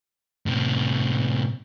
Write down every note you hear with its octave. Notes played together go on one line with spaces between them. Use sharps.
A2 C3